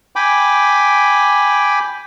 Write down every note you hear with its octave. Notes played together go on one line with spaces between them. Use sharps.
G5 G#5 B5 D6